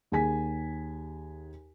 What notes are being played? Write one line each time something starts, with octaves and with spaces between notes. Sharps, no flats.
D#2 G#4 G#5 B6